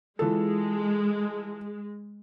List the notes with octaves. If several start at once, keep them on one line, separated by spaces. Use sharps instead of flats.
E3 G#3 F4 A4